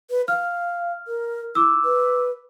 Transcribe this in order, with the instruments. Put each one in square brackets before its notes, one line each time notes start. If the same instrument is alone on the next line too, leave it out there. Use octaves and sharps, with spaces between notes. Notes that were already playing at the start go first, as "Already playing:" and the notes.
[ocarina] B4
[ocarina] F5 [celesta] F6
[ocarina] A#4
[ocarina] E4 [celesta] D6 E6
[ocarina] B4